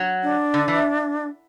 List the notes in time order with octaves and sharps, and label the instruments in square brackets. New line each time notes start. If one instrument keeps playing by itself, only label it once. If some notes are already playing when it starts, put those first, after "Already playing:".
Already playing: [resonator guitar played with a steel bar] F#3
[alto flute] D4
[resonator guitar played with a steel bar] D3
E3